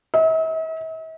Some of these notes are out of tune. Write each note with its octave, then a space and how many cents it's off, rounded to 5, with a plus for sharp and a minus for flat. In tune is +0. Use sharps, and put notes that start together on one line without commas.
E5 -45